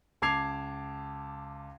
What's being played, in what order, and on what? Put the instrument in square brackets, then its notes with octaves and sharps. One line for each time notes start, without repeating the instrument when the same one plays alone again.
[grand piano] C#2 A5 D6 G#6 C7 F7